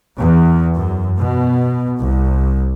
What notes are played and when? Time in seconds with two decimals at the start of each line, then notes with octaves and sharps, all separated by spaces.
0.18 E2
0.75 F#2
1.19 B2
1.98 C2